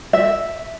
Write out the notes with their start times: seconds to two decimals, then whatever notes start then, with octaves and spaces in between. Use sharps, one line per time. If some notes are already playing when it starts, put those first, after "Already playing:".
0.13 E5